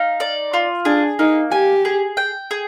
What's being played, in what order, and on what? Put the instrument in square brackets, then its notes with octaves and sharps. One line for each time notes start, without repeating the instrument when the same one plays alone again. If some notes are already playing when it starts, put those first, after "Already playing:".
Already playing: [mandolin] D#4 F5
D5
F4
[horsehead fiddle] D4 [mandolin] G#4
[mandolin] A#3 [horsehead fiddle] D#4
[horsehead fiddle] G4 [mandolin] G#5
[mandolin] G#4
G5
G#4